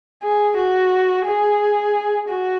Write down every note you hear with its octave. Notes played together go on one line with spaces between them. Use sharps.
G#4
F#4
G#4
F#4